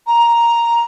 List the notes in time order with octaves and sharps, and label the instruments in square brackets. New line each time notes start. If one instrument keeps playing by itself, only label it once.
[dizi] A#5